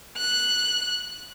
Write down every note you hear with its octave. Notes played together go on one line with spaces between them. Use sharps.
F#6